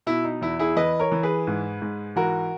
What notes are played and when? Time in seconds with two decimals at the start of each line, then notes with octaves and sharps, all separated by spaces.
0.07 B2 E4
0.25 D#4
0.41 E2 E4
0.59 E4 G#4
0.76 E3 B4 D#5
1.00 A#4 C#5
1.12 E3
1.23 G#4 B4
1.47 G#2
1.81 G#2
2.16 E3 F#4 A#4